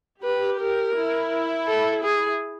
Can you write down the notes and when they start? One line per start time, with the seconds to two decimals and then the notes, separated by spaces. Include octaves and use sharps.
0.23 G4 B4
0.60 A#4
0.95 E4
1.68 A4
2.04 G#4